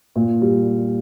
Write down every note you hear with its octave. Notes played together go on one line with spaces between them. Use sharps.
A#2
G3